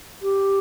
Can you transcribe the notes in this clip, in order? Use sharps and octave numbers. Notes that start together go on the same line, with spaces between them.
G4